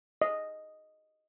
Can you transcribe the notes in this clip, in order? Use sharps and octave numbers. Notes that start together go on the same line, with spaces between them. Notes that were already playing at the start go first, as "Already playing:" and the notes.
D#5